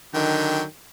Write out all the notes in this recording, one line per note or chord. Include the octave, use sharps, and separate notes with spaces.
D3 D#3 F#3 G5